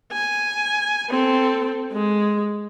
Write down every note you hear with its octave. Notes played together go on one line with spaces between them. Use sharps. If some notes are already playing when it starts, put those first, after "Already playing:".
G#5
C4 A4
G#3